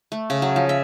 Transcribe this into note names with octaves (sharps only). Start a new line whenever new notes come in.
A3
C#3
F#3
F3
E5